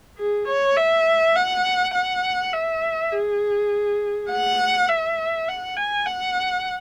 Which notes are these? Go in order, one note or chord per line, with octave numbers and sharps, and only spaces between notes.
G#4
C#5
E5
F#5
F#5
E5
G#4
F#5
E5
F#5
G#5
F#5